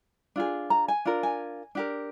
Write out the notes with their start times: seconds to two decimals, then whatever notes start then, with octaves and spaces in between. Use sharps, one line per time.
0.36 D4 F4 G#4
0.70 A#5
0.88 G#5
1.05 D4 F4 A#4
1.23 G#5
1.75 D4 G4 A#4